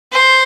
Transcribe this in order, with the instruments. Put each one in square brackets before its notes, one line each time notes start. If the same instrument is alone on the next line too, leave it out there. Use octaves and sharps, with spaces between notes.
[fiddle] C5